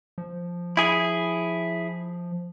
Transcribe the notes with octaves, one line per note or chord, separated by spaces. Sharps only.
F3
E4 G#4